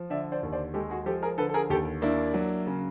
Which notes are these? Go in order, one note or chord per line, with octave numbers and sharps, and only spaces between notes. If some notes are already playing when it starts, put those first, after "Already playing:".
Already playing: F3
D3 D5 E5
C5 D5
D#2
C5 D5
G#3 G4 A4
F#4 G#4
F3 G4 A4
G#4 A#4
D3 A4 B4
A4
G#4 A#4
D#2 G4 A4
A#3 D4 E4
F#3
C#3